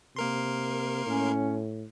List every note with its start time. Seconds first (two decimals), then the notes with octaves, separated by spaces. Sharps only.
0.16 C3 A#3 A#4 C6
1.06 A2 C#4